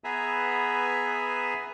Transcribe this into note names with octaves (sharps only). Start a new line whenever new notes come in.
B3 G#4 B4 E5 G#5 A#5